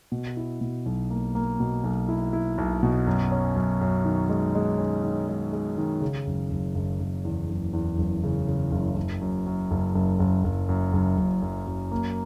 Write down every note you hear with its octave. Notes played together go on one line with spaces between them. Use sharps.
B2
E4
B2
B1
A#3
A#3
B2
B1
E4
E4
B1
B2
F#2
C#4
F#2
F#2
D#3
G#3
G#3
C#4
D#3
G#3
G#3
D#3
C#3
F#1
F#1
F#1
F#1
E2
F#1
E2
F#1
C#3
C#3
F#1
F#1
F#2
F#2
F#1
F#1
F#1
F#1
F#2
F#1
F#1
F#2
F#2
A#3